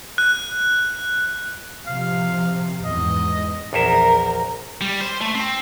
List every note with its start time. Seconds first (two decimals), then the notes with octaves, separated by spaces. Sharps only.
0.18 F#6
1.87 C3 F3 F5
2.85 E2 G#2 D#5
3.73 A#1 E2 A#4 E5
4.81 G3
5.01 C5
5.21 A3
5.35 C4